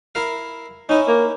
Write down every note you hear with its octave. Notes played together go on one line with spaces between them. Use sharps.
E4 A#4 F5
C#4 D#4 E4
A#3